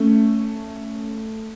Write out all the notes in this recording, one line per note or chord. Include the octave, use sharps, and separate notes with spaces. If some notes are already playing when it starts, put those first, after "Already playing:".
Already playing: A3 C#4